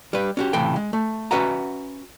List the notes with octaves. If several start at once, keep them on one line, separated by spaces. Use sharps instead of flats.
G3 B4
C#4 F#4 G4
C#2 A2 C3 E3 G5
G#3
A3
C#4 F#4 B4 E5 F#5 A#5